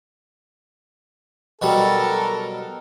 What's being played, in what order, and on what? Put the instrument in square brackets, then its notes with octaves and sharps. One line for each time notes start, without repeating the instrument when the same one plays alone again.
[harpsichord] B2 F#3 G3 [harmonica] A4 A#4